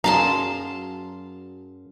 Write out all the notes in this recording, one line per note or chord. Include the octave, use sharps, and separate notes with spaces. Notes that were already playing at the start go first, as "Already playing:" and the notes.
F#2 F#3 G#4 F5 A5 A#5 C6